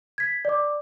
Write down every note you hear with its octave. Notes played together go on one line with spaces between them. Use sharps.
G#6 B6
D5 D6